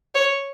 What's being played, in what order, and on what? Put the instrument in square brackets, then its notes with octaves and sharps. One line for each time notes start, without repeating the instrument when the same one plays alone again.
[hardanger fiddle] C#5